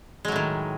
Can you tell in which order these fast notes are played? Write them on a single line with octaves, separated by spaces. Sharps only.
G#3 F#3 A2 D#3